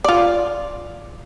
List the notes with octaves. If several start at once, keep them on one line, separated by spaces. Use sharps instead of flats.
F4 D5